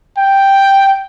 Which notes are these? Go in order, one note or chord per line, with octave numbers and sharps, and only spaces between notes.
G5